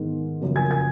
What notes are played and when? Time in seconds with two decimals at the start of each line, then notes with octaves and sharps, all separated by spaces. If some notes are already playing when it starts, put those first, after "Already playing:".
Already playing: G#2 D#3 G#3 B3
0.41 F#2 C#3 F3 A#3
0.56 G#5 G#6
0.71 G#5 G#6